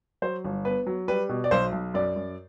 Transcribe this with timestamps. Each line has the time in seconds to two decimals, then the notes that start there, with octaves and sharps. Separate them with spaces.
0.22 F#3 C5
0.44 G1
0.65 B3 B4
0.87 F#3
1.08 G3 B4
1.29 B2
1.44 D5
1.51 B1 C5
1.72 B1
1.94 F#2 D5
2.16 F#2